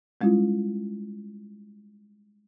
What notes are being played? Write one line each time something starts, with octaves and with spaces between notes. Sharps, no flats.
G3 G#3 C#4 E4 F4